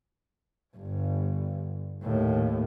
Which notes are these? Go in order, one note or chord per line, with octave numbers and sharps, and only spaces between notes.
G1 G2
D#2 A2